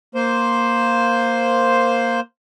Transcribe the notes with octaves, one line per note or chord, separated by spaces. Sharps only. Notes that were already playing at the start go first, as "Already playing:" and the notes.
A#3 C5